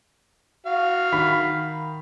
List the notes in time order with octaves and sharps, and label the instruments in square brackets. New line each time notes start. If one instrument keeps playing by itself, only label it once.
[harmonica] F#4 F5
[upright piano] D#3 B5 B6